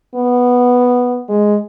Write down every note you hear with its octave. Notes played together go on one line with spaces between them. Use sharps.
B3
G#3